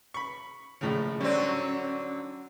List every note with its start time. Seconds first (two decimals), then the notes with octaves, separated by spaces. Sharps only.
0.14 B5 C#6
0.81 A#1 A2 C#3
1.20 D3 F#3 G3 C4 C#4